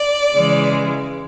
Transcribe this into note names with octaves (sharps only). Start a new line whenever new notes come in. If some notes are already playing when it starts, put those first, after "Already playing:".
Already playing: D5
C#3 E3 G#3